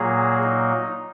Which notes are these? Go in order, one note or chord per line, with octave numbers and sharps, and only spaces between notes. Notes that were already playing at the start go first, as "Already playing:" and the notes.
Already playing: A#2 F#3 A#3 G#4
D#4